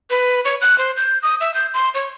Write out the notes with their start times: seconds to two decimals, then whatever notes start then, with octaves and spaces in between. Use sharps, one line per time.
0.10 B4
0.45 C#5
0.61 F#6
0.78 C5
0.96 G6
1.23 D#6
1.41 E5
1.54 G6
1.74 C6
1.94 C#5